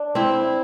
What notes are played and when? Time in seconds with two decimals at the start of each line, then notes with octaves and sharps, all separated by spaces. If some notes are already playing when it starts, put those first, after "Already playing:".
Already playing: D4
0.15 C4 E4